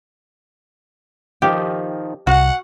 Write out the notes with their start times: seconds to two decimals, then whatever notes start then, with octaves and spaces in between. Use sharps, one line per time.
1.42 D#3 F3 D#4 G4
2.27 C2 F#4 F#5